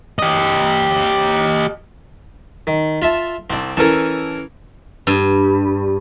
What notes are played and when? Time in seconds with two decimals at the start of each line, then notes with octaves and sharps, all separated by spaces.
0.19 G4 D#5
2.67 D#3
3.02 F4 E5 A5
3.50 C2 C4 D4
3.77 E3 C#4 A4 A#4 A5
5.07 G2